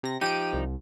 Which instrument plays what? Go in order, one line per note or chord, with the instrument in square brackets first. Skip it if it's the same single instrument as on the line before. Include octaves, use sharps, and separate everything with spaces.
[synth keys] C3 A#6
[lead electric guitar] F3 D#4 [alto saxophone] G4 [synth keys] D7 D#7
[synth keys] C2